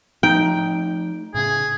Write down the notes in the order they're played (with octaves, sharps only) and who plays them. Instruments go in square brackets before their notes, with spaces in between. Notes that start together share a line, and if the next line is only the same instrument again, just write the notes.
[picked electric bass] F3 A3 [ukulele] D#4 [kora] G5
[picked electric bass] A2 C#3 [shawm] G#4